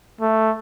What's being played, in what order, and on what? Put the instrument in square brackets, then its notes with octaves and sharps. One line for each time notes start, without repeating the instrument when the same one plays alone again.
[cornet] A3